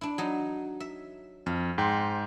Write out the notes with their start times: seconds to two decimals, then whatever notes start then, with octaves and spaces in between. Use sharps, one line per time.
0.01 D4 E4
0.18 F#3 D#4
0.80 E5
1.46 F2 F5
1.78 G#2 G5 C6